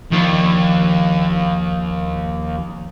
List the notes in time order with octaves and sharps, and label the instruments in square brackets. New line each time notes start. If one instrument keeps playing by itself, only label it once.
[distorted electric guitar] D#2 [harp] F3 D4